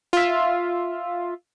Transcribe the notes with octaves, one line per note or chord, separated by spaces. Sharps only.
F4 E5